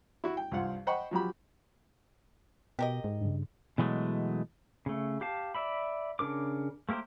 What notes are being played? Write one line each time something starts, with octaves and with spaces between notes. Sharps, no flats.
E4 F#4
G5
C2 G2 F4 F5 F#5
C5 D#5 F#5 G5 B5 C#6
F3 F#3 G4 B5
B2 G4 A#4 D#5
G#2
G2 C#3
B2 E3 F#3 G#3 A3
C#3 A3
G4 F5 A5
D5 E5 B5
C#3 D4 A#4 D6
A3 A#3 G4 A#4 C5